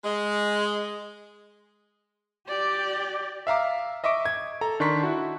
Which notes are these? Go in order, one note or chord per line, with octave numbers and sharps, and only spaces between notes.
G#3
G4 D5
E5 F5 A#5 D6
D#5 E5 C#6 D6 D7
G#6
A4 A#5
D#3 D4 C6 C#6 B6
E4 F#4